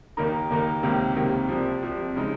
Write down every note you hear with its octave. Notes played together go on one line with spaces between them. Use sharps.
D#2 D#3 A#3 D#4 A#4
D#2 D#3 A#3 D#4 A#4
C#2 C3 D#3 A#3
C#2 C3 D#3 A#3
C2 C3 F3
C2 C3 F3
C#3 G#3 D#4